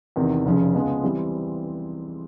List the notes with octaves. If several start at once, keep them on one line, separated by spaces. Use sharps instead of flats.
E2 C3 D#3
F1 F2 C#3
C#2 C#3 F3 G#3 B3
E3 G3 C4